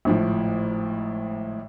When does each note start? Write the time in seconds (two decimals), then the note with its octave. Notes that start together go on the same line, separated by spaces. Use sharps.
0.05 G#1 A2 F3